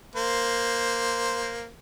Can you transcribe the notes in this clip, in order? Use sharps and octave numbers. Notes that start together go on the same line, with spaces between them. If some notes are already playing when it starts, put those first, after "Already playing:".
A#3 C5